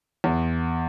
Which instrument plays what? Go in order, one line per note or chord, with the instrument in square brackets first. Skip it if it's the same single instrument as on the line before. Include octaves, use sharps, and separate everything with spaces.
[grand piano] E2